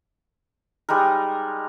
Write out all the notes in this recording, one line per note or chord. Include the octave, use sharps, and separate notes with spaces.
G3 G#3 D#4 A#4